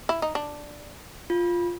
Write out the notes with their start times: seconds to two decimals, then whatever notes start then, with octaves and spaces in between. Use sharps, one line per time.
0.09 E4
0.22 D#4
0.35 D4
1.30 F4